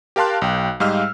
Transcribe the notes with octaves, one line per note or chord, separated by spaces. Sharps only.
G4 A#4 F5 A5 C6 F#6
B1 G5
G#2 G3 D#5 F5 E6 F6